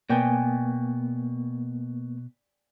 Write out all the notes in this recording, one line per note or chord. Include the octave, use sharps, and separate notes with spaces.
B2 A#3 B3 D5 G5 G#5